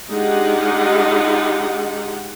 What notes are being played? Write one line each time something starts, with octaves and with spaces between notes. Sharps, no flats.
G#3 D4 D#4 F4 G4 F#5